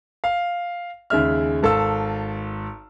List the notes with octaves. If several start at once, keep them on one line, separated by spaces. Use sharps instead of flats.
F5
D#2 C#3 G#3 E5 F6
G#1 A4 F5 E6